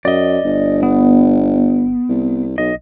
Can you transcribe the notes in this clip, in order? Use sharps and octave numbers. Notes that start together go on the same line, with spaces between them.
F#2 D5 D#5
G1
B3
C2
B1 D#5